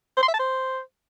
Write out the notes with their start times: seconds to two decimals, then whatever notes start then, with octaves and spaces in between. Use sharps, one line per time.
0.17 C5
0.23 C6
0.28 E5
0.34 A5
0.39 C5